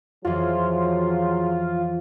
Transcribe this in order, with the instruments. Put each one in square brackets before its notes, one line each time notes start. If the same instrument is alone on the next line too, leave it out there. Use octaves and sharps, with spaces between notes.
[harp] F2 E3 [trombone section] F#3 G#4 [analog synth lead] F4